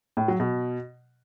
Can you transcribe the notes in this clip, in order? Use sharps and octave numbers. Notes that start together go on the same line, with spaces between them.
A2
F#3
B2